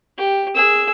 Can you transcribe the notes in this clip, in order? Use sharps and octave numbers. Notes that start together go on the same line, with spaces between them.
G4
G#4 E6